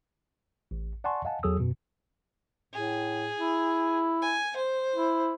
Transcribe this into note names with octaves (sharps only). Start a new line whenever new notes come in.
A1
D5 F#5 G#5 A5 C6 C#6
D#5 F5 F#5 G#5 A5
E2 F#3 G#4 A4 D#6 E6
F#2 B2
A2 G#4
E4
G#5
C5
E4